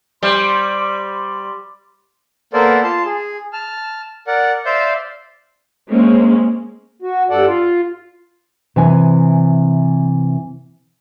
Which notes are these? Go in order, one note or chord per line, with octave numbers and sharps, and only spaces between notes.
G3 C5 C6
A#3 B3 A4 A#4 C5 D5
F4 A5 C6
G#4
A5 F6
A#4 D5 F#5
C5 D5 E5 F5 G6
G#3 A#3 C4 C#4
F#4
G2 A4 D5 F#5
F4
C3 E3 G#5